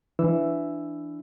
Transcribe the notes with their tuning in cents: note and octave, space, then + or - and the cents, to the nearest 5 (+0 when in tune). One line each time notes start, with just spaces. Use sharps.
E3 +15 D4 +0 E6 +5